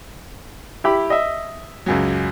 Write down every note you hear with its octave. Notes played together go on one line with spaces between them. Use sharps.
E4 G4 B5
D#5 E5
C#2 F#2 F#3